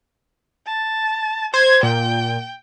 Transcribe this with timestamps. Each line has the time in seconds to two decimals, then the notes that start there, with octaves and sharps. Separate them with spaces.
0.66 A5
1.54 C5 G#6
1.83 A#2 G5